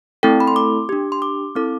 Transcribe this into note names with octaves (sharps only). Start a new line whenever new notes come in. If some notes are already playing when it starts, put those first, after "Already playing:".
A3 C4 E4 A4 G5
B5
C6
D6
D4 G4
C6
D6
C4 E4 A4 D6